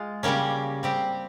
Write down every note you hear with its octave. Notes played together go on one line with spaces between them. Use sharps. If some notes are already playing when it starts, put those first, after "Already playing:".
Already playing: G#3 F4
C#3 G3 A#3 C#4
G3 C4 G4